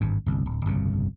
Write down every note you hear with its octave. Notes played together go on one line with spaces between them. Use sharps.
G#1 G2
G1 C2
D1
G1 C2 F2 C#3